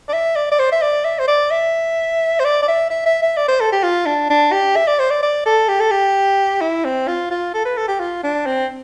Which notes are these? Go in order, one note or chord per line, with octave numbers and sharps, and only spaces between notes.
D5
E5
D5
D5
C5
E5
D5
E5
C5
D5
E5
C5
D5
D5
E5
E5
E5
E5
D5
C5
A4
G4
F4
D4
D4
G4
E5
D5
C5
D5
D5
A4
G4
A4
G4
E4
C4
F4
F4
A4
B4
A4
G4
F4
D4
C4